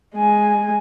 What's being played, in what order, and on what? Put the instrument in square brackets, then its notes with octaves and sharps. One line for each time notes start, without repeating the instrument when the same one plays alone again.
[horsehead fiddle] G#3 G#5